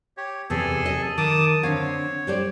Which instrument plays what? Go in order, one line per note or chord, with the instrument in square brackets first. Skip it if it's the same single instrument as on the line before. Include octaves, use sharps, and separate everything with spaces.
[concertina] G4 C#5
[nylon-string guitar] E2 C3 [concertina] G#4 A4
[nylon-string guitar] D#5
[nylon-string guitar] D#3 [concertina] A5 D6 D#6
[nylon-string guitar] D3 C4 F5 [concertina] C#5
[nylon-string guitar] G3 C5 D5